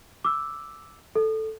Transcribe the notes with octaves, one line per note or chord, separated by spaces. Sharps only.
D6 E6
A4